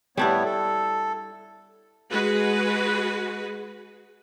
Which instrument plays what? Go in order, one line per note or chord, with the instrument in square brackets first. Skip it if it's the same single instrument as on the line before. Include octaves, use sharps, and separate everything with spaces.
[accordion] A2 B3 C#5 [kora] G3 D4 E4
[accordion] A4
[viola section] G#3 F#4 G#4 B4